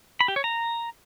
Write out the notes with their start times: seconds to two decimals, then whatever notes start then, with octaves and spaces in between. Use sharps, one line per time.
0.21 B5
0.28 G4
0.36 C#5
0.44 A#5